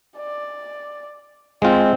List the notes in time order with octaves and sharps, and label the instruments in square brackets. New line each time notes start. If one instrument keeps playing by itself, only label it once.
[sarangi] D5
[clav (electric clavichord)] G#3 F4 [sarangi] C4